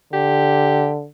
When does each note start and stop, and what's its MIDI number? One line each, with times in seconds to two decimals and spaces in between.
0.13 1.07 50
0.13 0.90 67